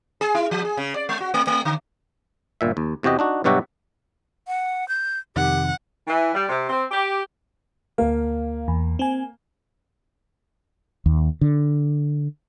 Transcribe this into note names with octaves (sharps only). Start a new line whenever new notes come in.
G#4
E4
F3
G#4
C#3
D5
G#3
F#4
A3
A3
D3
G1 A#2 E5
D#2
E2 C3 F#4 G4 D#5
D4 D#4 F#4
G2 B2 F#3 F#4 G4 E5
F#5
G6
F2 C3 D#3 G4 F#5
E3
G3
C3
C4
G4
D2 A#3 F5
E2
C4 G#5
D#2
D3